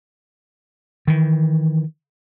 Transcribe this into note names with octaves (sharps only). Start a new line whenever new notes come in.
D#3 E3